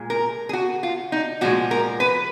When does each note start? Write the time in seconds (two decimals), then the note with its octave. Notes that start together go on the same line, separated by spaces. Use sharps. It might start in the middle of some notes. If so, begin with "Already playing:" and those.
Already playing: A#2 G#3
0.10 A#4
0.49 G#4
0.53 F#4
0.83 F4
1.12 D#4
1.41 A#2 F3 G#3 F#4
1.71 A#4
2.00 B4